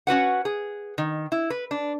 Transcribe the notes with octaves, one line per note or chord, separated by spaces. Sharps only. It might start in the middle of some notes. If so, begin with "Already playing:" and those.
C#4 F#4 B4 F#5
G#4
D#3
E4
B4
D4